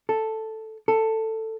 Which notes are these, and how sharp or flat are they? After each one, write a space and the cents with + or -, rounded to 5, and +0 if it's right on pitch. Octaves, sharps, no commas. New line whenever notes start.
A4 +0
A4 +10